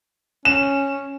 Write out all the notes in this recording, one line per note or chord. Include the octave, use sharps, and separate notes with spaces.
C#4 E7